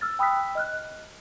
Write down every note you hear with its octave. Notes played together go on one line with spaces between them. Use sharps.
E6 F6 A6
G5 B5 D#6 E6 F#6 B6
D#5 F6 F#6